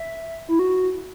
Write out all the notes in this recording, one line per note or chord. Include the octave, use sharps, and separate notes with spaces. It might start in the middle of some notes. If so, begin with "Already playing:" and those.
Already playing: E5
E4
F#4